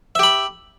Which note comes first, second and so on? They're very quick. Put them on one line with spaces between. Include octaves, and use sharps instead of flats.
E5 G4 B5